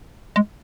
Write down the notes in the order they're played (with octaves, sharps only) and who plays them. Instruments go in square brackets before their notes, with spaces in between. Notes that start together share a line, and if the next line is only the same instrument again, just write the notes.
[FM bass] G#3